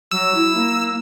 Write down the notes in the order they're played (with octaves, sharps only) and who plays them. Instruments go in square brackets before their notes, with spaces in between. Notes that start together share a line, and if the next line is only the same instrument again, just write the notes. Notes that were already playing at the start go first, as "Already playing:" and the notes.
[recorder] F#3 [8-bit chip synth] E6
[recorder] E4
A#3